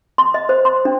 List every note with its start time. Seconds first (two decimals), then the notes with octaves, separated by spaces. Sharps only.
0.18 C6
0.34 D#5
0.49 C5
0.65 C6
0.85 D4